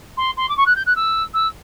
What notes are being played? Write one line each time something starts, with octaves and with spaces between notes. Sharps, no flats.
C6
C6
D6
C#6
F#6
G6
F#6
E6
E6